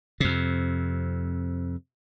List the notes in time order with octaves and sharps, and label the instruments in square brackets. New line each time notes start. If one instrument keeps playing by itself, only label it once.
[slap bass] F2 C3